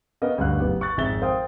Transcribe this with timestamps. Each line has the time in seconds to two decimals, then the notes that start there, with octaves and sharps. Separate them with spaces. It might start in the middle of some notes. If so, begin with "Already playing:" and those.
0.22 B3 C#4 A#4 D#5 F5
0.38 D2 G2 C#4 F5 F#6
0.60 F#1 B3 G4
0.81 C#6 F#6 A6
0.97 G#1 F2 G#4 E5 A6 G7
1.21 A#4 C5 F5 G5 D#6